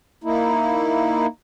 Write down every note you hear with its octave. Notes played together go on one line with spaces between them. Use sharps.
A#3 D#4 E4